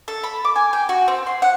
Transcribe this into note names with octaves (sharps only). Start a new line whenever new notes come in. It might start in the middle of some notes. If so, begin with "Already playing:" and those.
A4
B5
D6
G#5
G5
F#4
C4
C6
F#5